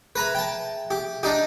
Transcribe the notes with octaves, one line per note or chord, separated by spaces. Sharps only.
G#4 B4 E5 A#5 B5
G5 A5
G4
D4 D#4 G4 D#5